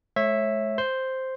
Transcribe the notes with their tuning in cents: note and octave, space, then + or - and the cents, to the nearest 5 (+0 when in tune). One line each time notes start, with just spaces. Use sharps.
G#3 +40 C#5 -25 E5 +0
C5 +0 C6 +0